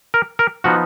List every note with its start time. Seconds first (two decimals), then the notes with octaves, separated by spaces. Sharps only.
0.14 A#4
0.39 A#4
0.64 F3 B3 D#4 F#4